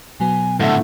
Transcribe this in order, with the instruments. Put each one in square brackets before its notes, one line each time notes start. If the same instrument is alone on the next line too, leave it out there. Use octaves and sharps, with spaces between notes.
[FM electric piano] B2 F#3 B3 [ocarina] G#5
[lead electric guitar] A2 D3 [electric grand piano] A3 E5 [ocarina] F#5